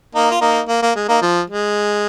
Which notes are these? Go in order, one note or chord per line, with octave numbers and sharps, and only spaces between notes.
A#3 D#4
F4
A#3 D#4
A#3
A#3
G#3
A#3 D#4
F3
G#3